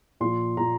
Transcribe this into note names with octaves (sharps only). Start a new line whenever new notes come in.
A#2 F3 C6
A#2 F3 A#5